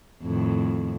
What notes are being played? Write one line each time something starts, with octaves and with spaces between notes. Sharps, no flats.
F2 A2 D#3